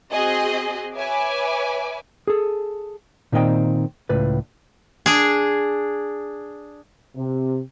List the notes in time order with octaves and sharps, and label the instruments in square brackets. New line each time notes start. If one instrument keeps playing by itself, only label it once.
[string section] C4 F#4 G#4 D#5
B4 C#5 E5 G#5 D6
[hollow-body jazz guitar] G#4 A4
A#2 D#3 C4 D#5 G5
C#2 A2 B4 D5
[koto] D4 G#4
[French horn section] C3